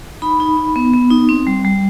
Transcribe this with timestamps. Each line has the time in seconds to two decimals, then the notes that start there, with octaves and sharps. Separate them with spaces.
0.22 D#4 B5
0.40 D#4
0.57 D#4
0.76 B3
0.93 B3
1.11 D#4
1.29 C4
1.47 G3
1.65 G3